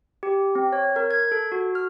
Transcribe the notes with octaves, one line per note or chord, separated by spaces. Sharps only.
G4
C4
C#5
A#4
G#6
A4
F#4
F6